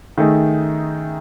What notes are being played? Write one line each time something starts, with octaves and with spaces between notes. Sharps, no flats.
D#3 A3 D#4 G#4